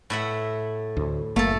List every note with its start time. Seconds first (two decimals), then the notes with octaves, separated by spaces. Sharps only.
0.10 A2 E5 F#5
0.97 D2
1.36 F#1 A3 A#3 A4